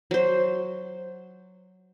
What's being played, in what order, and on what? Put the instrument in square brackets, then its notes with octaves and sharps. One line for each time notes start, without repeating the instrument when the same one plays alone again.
[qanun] F#3 C5